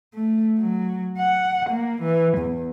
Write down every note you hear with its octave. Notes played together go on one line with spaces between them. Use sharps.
A3
F#3
F#5
A#3
E3
E2